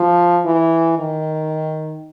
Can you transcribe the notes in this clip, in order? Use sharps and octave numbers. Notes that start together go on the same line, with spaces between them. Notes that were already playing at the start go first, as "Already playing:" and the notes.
Already playing: F3
E3
D#3